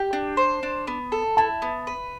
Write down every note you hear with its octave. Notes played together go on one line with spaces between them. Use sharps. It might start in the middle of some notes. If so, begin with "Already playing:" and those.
Already playing: G4 G5
D4
C5
D4
B3
A4
E4 A5
B3
B4